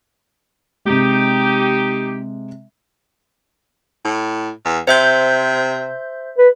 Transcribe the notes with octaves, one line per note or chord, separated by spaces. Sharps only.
C3 G#3 D#4 G4
A2
E2
C3 C5 E5 G6
B4